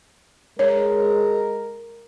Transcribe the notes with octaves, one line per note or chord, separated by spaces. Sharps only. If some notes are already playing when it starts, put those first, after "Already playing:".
G#3 A#4 C#5